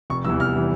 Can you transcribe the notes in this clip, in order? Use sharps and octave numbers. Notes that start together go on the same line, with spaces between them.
F1 C#6
E2 E3 G3 E6
F1 F6
E3 G3